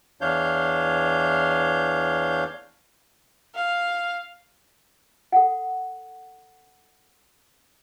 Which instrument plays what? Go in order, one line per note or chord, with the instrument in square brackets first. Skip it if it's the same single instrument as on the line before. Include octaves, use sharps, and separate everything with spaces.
[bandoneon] E2 E3 D4 C#5 F5 G6
[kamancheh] F5
[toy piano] A4 F#5